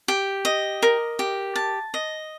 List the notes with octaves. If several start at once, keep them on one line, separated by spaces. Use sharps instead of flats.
G4
D#5
A#4
G4
A5
D#5